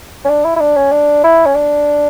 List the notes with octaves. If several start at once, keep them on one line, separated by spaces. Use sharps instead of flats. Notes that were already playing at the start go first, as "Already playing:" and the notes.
C#4
D4
E4
E4
D4
C#4
D4
E4
C#4
D4